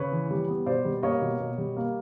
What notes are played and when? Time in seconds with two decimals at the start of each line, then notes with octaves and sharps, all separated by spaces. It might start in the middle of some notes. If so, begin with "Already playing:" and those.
Already playing: C#3 B4 C#5
0.11 E3
0.31 G3
0.49 B3
0.66 B2 C5 D5
0.85 G3
1.03 A#3 C#5 D#5
1.22 B2
1.40 B2
1.58 G3
1.77 A#3